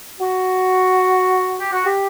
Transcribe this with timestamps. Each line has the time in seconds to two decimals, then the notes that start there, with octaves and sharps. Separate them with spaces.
0.20 F#4
1.60 G4
1.72 F#4
1.86 G4